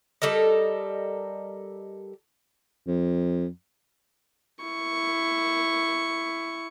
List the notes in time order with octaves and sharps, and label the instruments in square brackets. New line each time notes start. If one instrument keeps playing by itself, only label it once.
[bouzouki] G3 A4 A#4 D#5
[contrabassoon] F2
[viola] E4 C#6